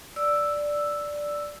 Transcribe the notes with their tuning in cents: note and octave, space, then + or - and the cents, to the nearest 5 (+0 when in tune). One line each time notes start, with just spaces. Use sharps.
D5 +0 E6 +0